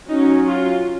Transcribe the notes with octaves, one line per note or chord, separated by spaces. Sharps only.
F#3 C#4 D#4
F4